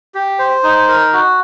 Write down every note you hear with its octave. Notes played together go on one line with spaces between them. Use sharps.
G4
C5
D#4
A#4
F#4